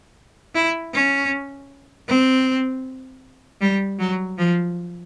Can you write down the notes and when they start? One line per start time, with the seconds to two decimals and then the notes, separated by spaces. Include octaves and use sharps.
0.55 E4
0.93 C#4
2.08 C4
3.61 G3
3.99 F#3
4.38 F3